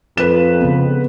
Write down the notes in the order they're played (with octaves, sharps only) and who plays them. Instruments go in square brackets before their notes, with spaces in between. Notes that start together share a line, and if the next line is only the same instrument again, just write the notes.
[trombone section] F2 [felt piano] B4 E7
[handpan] C#3 B3